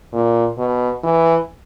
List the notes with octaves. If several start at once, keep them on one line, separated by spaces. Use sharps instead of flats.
A#2
B2
E3